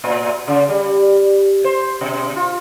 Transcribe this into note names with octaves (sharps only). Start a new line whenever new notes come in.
A2
C#3
G3
C5
B2
F4